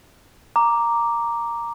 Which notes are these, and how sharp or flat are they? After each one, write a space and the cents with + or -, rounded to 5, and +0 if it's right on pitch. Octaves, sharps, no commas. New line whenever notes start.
A#5 +0 D6 +0